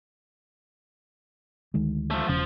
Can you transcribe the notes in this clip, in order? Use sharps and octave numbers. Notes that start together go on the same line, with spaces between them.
D2 D#3 G#3
F3 A3
E1 C#3 F3 C#4